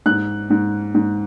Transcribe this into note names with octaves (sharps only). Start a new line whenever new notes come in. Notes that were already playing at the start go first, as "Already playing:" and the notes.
G#2 F#6
G#2
G#2